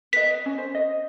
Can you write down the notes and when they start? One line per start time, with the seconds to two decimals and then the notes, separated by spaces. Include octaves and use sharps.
0.13 B4 D#5 B6
0.26 D#5
0.46 C#4
0.58 C5
0.75 D#5